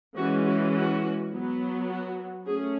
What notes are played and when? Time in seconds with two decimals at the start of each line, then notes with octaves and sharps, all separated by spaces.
0.17 E3 G#3 C#4 F#4
0.46 F#4
0.74 F#4
1.32 F#3 B3
1.90 F#4
2.47 A3 C#4 G#4